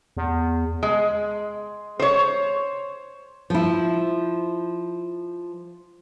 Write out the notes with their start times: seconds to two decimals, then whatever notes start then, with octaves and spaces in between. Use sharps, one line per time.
0.17 E2
0.83 G#3
1.99 C5 C#5
3.50 F3 E4